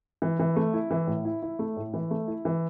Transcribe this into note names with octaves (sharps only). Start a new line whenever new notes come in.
E3
E3
A3
E4
E3
A2
E4
E4
A3
A2
E3
A3
E4
E3